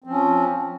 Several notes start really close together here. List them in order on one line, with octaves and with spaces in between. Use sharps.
C4 F3 C#4